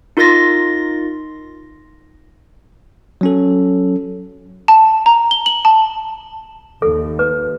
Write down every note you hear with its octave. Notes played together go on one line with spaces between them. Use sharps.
D#4 F4 A#4 C6 A6 A#6
F#3 C#4 A4
A5
A#5
G7
F#7
A5
D#2 A4
B4